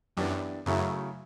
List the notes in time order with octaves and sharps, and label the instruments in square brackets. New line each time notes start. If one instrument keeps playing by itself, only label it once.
[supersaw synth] F#2 [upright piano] E3 B3 D4 G4
[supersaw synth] F#2 [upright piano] C#3 F#3 A3 E4